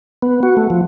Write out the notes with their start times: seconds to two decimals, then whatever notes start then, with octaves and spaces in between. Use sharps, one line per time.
0.22 B3
0.43 F#4
0.57 A3
0.70 F3